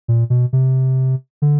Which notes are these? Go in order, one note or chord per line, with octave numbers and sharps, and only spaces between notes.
A#2
B2
C3
D3